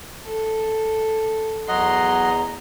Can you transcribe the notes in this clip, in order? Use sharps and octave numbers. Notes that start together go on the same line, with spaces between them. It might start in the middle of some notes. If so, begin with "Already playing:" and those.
A4
E2 F#3 D#5 F#5 A#5 C6